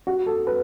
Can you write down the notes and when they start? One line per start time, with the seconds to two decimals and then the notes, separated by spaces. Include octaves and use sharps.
0.07 F#4
0.26 A4
0.47 B4